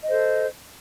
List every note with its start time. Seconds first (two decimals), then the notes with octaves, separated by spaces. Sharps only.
0.04 D#5
0.07 C5
0.10 A4